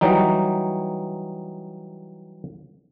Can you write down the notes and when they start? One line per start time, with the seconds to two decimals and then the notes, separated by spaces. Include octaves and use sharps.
0.01 E3 F#3 G3 D#4